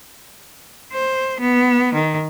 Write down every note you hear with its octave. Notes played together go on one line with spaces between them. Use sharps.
C5
B3
D#3